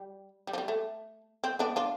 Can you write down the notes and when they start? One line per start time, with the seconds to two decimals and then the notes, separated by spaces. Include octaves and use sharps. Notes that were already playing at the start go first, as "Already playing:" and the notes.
Already playing: G3
0.47 G3
0.53 F3
0.58 G3
0.68 A3
1.44 C4
1.59 B3 D4
1.76 D4 F4